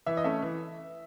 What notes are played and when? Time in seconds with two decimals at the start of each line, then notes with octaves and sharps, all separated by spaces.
0.06 E3 E5
0.17 D#5
0.24 A3 C#4 E5
0.42 E3